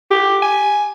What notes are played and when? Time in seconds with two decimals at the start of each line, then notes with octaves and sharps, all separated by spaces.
0.11 G4
0.42 G#5